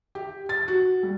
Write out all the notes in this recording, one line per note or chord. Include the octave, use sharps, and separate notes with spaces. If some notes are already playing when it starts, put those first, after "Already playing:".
G4
A6
F#4
G3